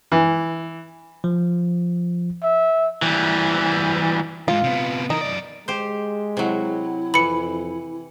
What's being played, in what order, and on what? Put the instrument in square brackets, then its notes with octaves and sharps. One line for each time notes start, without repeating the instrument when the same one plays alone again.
[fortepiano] E3
[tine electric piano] F3
[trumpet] E5
[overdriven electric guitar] E3 G3
[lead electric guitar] F2 G#2 [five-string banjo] F4
[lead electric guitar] C3 B3
[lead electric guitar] E3 A#4 [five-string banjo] D#4
[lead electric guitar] F#2 D5
[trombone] G#3 [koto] G4 C5
[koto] C3 F#3 [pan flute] E4
[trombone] F2 [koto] E3 [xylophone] B5 C#7